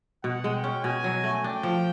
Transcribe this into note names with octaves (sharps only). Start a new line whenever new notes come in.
B2 F#5
G#3
G5
C#4
B2 G#5
F#3
A3
D4 G5
F3